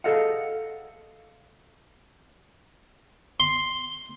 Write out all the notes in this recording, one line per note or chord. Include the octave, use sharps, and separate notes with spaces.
G#4 A4 D#5 F5 F#5
C6